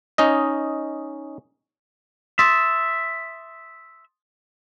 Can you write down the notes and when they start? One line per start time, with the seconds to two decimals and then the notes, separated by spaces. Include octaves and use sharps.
0.18 C#4 D#4 D#5
2.39 E5 C6 D#6 A6